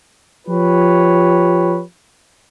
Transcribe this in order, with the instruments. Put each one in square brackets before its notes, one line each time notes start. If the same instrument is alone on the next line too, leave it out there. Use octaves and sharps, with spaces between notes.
[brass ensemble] F3 F4 G4 B4 C#5